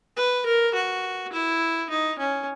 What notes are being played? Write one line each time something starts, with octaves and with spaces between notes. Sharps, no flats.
B4
A#4
F#4
E4
D#4
C#4